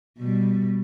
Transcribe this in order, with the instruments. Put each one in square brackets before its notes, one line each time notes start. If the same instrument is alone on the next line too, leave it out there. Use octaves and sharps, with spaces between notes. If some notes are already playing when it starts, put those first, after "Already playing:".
[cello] B2 G3